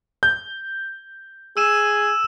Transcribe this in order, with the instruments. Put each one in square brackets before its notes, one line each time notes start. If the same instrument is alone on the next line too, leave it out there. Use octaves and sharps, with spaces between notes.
[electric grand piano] G6
[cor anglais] G#4 [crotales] E6 D#7 E7